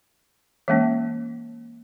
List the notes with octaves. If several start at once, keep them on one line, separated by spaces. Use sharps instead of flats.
E3 G#3 A#3 C#4